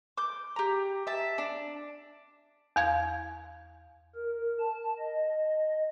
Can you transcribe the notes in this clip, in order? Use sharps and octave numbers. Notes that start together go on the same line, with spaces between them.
D6 G6
G4 A#5
E5 A5
D4
E2 F5 G#6
A#4
A5
D#5